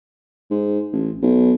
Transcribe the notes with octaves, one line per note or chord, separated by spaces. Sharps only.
G#2
A1
B1